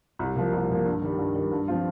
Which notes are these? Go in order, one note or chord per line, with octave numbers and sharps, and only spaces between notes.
C2
A#2 F3 A#3
C2
A#2 F3 A#3
G2
D#3 G3
G2
D#3 G3
G2
F3 C4 F4